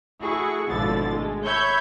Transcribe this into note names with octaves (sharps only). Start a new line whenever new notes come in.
A3 E4 F#4 G#4 C#6
G#1 B2 D3 F3 E4 A6
G#3 A3
C#5 E5 B5 C#6 G6 G#6